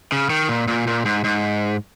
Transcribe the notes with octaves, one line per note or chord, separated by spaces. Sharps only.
C#3
D#3
A#2
A#2
A#2
G#2
G#2